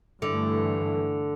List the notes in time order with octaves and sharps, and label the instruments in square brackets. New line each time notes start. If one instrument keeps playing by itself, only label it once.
[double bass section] G2 E3 A3 [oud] D3